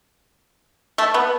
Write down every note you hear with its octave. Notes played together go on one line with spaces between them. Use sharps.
A3
B3